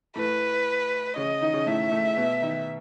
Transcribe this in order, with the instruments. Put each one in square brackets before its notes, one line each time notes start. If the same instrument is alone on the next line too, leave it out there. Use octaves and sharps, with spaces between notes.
[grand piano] A2 A3 [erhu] B4
[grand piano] C#3 C#4 [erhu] D#5
[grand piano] D#3 D#4
C#3 C#4
[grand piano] A2 A3 [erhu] E5
[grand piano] A2 A3
B2 B3
D#3 D#4